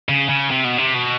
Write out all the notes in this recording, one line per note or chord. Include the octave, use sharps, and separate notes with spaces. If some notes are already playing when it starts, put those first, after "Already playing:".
C#3
C#3
C3
B2
C3
B2